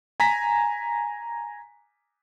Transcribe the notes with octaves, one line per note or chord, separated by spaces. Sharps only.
G#5 A#5 B6